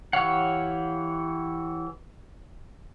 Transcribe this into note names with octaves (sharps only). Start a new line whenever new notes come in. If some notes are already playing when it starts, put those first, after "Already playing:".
E3 G4 C#5 F5 F#5